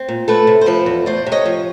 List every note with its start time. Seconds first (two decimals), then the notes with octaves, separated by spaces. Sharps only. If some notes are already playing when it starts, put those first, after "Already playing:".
Already playing: C4
0.09 A#2
0.28 A3 A4 B4
0.47 C3
0.61 C5
0.66 F3 A4 B4
0.86 E2
1.06 A3 C5 D5
1.26 C3
1.32 C#5 D#5
1.45 F3